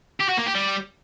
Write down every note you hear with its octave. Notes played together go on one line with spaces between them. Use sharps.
G4
F#4
A#3
G4
G3